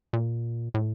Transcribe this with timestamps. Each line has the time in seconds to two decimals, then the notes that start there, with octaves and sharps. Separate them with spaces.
0.13 A#2
0.74 A2